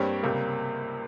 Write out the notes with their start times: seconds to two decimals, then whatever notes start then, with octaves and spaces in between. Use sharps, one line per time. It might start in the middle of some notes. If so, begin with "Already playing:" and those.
Already playing: G2 G3 A#3 C4 G4 C#5
0.23 C#2 C3 G3 A#3